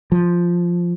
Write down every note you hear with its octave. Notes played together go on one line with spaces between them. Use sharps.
F3